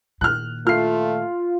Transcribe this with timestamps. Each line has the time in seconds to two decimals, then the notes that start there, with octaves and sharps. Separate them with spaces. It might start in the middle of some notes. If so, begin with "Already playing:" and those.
0.21 A#2 D#3 F6 F#6
0.67 A3 F4 F6 C7